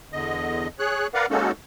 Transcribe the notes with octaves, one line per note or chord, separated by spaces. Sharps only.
E2 D3 D#5
G#4 C#5 F#6
A#4 B4 D5 F5 F#5
G#3 A#3 C#4 D#4 F#4 A4